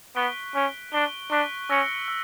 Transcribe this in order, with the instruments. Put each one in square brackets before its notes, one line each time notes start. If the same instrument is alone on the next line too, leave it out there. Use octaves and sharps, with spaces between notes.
[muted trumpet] B3 [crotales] C#6 F#6 B6 D7 G7
[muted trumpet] C#4 [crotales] C#6 F#6 B6 D7 G7
[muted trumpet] D4 [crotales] C#6 F#6 B6 D7 G7
[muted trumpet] D4 [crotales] C#6 F#6 B6 D7 G7
[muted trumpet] C#4 [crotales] E6 A#6 C#7 F#7
[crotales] E6